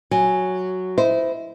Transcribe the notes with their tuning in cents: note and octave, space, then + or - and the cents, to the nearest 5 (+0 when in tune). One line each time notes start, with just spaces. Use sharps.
F#3 +0 G#5 +0
E4 +0 C5 -20 D#5 +5